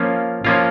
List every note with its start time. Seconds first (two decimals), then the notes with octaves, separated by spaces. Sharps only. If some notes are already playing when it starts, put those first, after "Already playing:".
Already playing: F3 A#3 C#4 F4
0.45 F3 A#3 C#4 F4